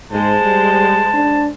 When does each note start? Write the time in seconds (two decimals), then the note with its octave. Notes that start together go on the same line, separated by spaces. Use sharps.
0.11 G#2 G#3 C5 A5
0.42 G3
1.14 D4